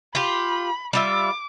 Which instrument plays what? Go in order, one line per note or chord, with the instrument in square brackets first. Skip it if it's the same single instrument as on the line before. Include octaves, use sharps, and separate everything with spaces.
[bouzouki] F4 G4 [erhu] B5
[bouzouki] G3 F4 E5 [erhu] D6